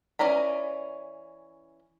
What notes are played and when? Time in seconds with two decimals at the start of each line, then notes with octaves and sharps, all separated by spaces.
0.19 E3 C#4 D5 A#5 B5